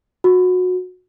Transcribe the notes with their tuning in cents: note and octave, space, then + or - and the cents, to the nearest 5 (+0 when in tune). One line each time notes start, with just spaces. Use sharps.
F#4 -25